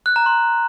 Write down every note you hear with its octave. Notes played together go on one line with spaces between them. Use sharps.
F#6
A#5
C6